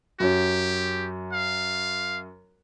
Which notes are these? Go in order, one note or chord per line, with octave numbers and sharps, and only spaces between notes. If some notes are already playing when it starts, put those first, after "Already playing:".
F#2 F#4 G4 C#5
F5